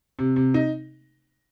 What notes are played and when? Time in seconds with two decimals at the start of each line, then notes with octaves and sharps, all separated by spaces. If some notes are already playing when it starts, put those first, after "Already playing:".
0.19 C3
0.36 C3
0.54 D#4